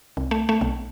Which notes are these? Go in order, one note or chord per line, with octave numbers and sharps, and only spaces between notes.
C2
A3
A3
B1